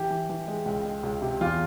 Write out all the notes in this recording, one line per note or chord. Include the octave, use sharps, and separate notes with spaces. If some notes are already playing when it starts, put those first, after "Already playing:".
Already playing: E3 G4
E3
E3
G#3
C#2
G#3
C#2
C3
E2 F4